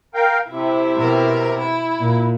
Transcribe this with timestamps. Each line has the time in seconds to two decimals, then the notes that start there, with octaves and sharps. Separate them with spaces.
0.14 A#4 F5 G5
0.50 C3 E4
0.96 B2 A#4
1.59 E4
1.99 A#2